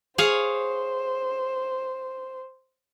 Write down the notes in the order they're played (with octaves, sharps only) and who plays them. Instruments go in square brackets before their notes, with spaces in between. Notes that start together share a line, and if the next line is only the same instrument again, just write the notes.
[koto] G#4 C#5 F5 [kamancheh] C5